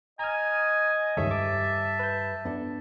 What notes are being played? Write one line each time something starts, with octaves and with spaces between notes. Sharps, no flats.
D#5 G#5 A#5 F6
C#2 G2 D#3 A4 C#5 E5
A5 D6
B4 G6
B3 D4 A4